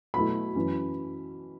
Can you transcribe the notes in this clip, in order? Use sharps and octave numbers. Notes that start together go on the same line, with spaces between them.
B2 F#3 A3 E4 B5
F#2 E3 C#4 E4